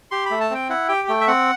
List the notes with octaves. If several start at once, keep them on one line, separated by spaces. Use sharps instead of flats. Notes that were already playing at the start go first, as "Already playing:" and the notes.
G4 C6
B5
A3
A5
C4 G5
E4 F#5
G4 G5
A3 G5
E5
C4 F#5